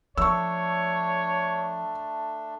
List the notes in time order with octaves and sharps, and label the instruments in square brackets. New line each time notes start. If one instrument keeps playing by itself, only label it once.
[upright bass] F3 [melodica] A3 D4 [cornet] C#5 [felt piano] C#6 E6